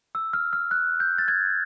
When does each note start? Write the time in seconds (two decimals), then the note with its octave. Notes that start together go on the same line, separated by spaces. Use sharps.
0.15 E6
0.33 F6
0.53 F6
0.71 F#6
1.00 G6
1.18 A6
1.28 G#6